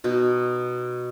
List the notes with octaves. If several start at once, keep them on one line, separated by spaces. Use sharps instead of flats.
B2 D#4